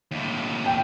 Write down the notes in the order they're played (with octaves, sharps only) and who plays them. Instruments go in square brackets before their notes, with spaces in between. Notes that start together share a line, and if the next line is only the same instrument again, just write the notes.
[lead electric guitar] D#2 A2
[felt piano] G5